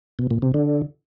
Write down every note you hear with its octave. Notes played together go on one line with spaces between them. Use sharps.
B2
A#2
C3
D3